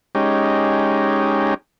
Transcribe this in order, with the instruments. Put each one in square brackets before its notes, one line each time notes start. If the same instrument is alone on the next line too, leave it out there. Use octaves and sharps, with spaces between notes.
[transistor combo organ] G#3 C#4 D#4 G4